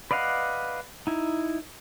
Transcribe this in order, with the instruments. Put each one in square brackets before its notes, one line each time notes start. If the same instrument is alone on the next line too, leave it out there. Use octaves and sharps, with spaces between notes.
[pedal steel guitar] B4 D5 D#5 F5 F#5
D#4 E4